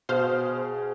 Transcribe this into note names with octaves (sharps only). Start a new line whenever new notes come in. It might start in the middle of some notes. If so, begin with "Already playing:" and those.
B2 G#4 C5 F5 F6